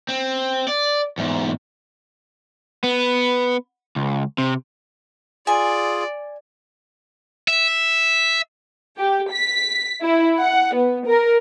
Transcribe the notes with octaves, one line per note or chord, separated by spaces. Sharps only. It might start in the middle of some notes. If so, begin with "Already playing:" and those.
C4
D5
E2 G#2
B3
C#2
C3
F4 G#4 D5 G#5
E5
G4
B6
E4
F#5
B3
A#4